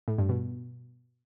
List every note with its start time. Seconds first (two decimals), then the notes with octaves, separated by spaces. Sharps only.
0.08 A2
0.18 G2
0.29 B2